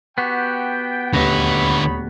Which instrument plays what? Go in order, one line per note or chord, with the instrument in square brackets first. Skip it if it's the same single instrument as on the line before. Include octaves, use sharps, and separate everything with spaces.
[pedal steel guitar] B3 F#4 G4 [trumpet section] G5
[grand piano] D#1 D2 A#6 [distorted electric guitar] D3 B4 [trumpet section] D#4 C#5 B5